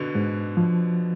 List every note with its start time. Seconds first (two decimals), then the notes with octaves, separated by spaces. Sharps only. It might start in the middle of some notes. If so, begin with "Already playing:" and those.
Already playing: B2 D3
0.15 G#2
0.57 F3